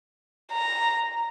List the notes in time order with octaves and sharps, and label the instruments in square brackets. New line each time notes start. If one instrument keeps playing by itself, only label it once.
[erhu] A#5